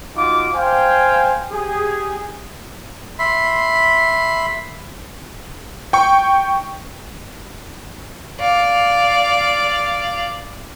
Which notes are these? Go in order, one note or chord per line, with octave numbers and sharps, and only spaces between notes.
D#4 F4 F#4 D6
C5 F5 G5 G#5
G4 G#4
E5 B5 C6
G5 C#6
D5 F5